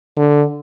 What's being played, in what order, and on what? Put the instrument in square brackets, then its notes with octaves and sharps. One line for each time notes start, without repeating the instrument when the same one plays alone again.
[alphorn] D3